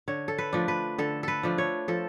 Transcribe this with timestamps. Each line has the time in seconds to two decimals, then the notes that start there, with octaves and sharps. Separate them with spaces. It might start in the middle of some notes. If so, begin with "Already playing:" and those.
0.08 D3 C#5
0.28 A4
0.38 B4
0.53 F3 A3 D4
0.68 B4
0.98 D3 A4
1.23 A4 B4
1.43 F3 A3 D4
1.58 C#5
1.88 F3 A4